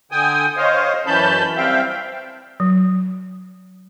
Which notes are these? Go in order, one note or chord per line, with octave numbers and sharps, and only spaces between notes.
D3 G5 G#5 D#6
C5 C#5 D#5 F5
F#2 E3 C#4 A5 B5 G6
G3 C4 E5 F5 G5
F#3